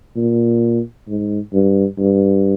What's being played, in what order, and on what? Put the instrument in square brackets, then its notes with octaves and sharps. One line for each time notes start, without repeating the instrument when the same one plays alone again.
[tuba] A#2
G#2
G2
G2